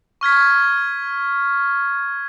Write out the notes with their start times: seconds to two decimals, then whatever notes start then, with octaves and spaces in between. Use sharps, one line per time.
0.21 C#6 F6 G#6 B6